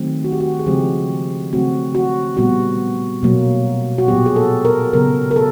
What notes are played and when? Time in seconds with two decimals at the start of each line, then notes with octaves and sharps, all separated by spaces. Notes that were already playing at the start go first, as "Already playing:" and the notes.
Already playing: D#3 F#3 A3 C4
0.24 F#4
0.32 G4
0.40 F#4
0.59 G#4
0.66 C#3 F3 G#3 C4 G4
1.53 C#3 F#3 A3 C4 F#4
1.95 F#4
2.37 A#2 G3 B3 F#4
3.23 B2 F#3 A#3
3.98 F#4
4.08 A#2 F#3 B3 G4
4.26 G#4
4.36 A4
4.65 A#4
4.93 C#3 F#3 B3 A#4
5.31 A#4
5.36 A4